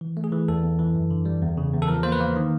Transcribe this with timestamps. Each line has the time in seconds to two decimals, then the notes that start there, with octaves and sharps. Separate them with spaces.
0.01 E3
0.17 A3
0.24 G#4
0.32 E3
0.48 E2 A4
0.63 E2
0.79 E3
0.95 F#2
1.11 D3
1.25 G3
1.42 E2
1.57 C#3
1.73 E2
1.82 A4
1.88 F3 A#4
2.03 A#3 C5
2.12 B4
2.20 A#3
2.36 D#3